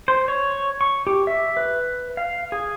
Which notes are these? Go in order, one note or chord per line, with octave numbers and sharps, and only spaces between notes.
C5
C#5
C#6
G4
E5
B4
F5
G#4